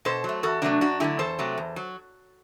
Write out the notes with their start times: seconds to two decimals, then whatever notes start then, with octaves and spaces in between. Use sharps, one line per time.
0.05 B2 A4 C5
0.24 F#3 A3
0.43 E2 F#4 A4
0.62 C3 F#3 A3 D4 F#4
0.81 F#2 D4 F#4
1.00 D3 F#3 A3 E4 G4
1.19 E2 A4 C5
1.39 C3 F#3 A3
1.58 E2
1.76 F#3